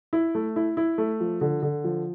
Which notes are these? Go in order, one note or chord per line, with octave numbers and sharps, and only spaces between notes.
E4
A3
E4
E4
A3
F3
D3
D3
F3